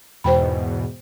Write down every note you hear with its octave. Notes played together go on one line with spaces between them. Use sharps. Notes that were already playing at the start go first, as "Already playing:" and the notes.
E2 G#2 B2 C5 G5 B5